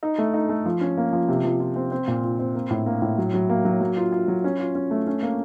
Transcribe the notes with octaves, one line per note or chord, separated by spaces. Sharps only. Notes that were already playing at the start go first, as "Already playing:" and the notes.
D#4
A3
D#4
A3
F3
C#4
A#3
F3
C3
F3
F4
C4
C4
A#2
F4
C4
A#3
A2
A#3
A2
F#3
F#3
A#3
F#3
F#3
F4
F4
F#3
C#4
F4
C#4
A3
C#4
A#3